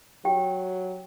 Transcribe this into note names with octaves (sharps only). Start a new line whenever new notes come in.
F#3 G4 G5